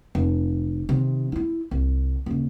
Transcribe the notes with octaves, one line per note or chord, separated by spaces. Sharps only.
F1
C3 D#3
D#4 E4
C2
D#1 C#3